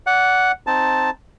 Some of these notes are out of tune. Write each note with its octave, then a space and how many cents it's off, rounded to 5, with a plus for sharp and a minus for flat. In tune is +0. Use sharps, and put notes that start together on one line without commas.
D5 -30 F#5 +0
C4 +0 D#4 +0 A5 +0